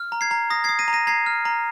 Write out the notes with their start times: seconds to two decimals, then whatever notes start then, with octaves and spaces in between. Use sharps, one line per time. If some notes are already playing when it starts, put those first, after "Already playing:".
Already playing: F6
0.12 A#5
0.21 G#6 C7
0.31 A#5
0.50 D#6 A#6
0.64 D#6 G#6 C7
0.79 A#6 D#7
0.88 A#5
0.93 A#6 D#7
1.07 A#5 G#6 C7
1.26 F6
1.45 A#5